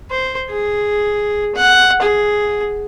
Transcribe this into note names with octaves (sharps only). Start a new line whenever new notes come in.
C5
G#4
F#5
G#4